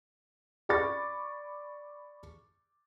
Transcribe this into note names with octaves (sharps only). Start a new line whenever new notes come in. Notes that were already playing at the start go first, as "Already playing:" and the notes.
D5 B5 C#6 D6 A6